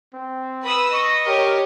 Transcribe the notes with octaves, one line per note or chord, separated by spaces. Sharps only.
C4
B4 B5 D#6 E6
D#5 C#6
G4 A#4 C#5